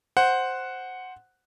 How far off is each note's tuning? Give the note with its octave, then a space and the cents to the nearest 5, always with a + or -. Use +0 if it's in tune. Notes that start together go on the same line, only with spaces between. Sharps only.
C5 +0 F#5 +0